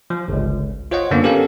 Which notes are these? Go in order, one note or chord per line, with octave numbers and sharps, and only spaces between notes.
F3
G1 C#2
F4 C5 C#5 D#5 F#5
F#2 D3 A#3 B3 D4
B3 C#4 G4 A4 A#4 F5